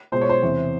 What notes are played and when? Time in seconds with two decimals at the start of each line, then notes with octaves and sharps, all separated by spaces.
0.12 B2 G#3 C5
0.21 C#5
0.29 C5
0.42 E2 C3 E3